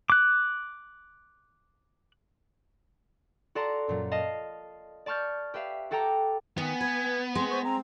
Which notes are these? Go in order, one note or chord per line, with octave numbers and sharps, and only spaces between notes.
D6 F#6
F#4 A4 D5 A5 A#5 C6
F#2 A#2 F#3
D#5 F5 A5
D5 A5 C#6 F6 G6 A6
G4 B4 E5 F5
F#4 A4 G5 A5 A#5 D6
D#3 B3 G#5
B4 G#6
G#3 C4 C6
C5 C#6
C4 A#5